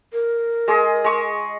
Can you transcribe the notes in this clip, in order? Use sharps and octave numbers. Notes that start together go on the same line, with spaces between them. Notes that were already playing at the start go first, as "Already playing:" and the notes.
A#4
G#3 G#4 D#5
G#3 C#6